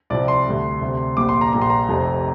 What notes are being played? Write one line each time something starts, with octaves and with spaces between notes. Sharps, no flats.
C2 C3 F3 D5
C6
D2 D3 G3
D2 C3 G3
A#1 A#2 G3 D6
C6
A#5
A#1 A#2 G3 A#5
C6
A#5
F1 F2 C3 G3